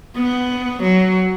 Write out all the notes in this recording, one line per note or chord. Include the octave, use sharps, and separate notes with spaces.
B3
F#3